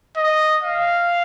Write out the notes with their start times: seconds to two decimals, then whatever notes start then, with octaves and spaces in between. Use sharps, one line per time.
0.17 D#5
0.63 F5